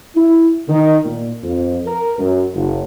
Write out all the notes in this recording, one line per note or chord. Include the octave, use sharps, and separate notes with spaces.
E4
D#3
A#2
F2
A#4
F#2
F#1